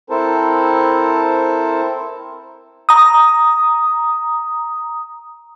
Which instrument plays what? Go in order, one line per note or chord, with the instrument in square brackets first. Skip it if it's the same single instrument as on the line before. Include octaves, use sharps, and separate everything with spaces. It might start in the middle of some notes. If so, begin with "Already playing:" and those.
[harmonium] C4 E4 A4 A#4 C5 A5
[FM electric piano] A#5 D#6